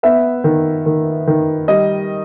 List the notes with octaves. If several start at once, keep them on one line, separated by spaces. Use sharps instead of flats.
B3 E5
D#3
D#3
D#3
G3 D#5